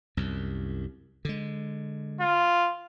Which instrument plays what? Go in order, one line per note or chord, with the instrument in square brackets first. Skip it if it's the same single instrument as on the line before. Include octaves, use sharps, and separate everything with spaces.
[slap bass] C2 F#2
D3 G#3
[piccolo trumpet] F4